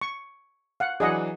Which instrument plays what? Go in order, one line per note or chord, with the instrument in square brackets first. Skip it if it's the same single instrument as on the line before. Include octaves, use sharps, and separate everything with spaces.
[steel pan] C#6
F5 F#5
[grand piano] E3 F#3 D4 [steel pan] G#4 D#5 F#5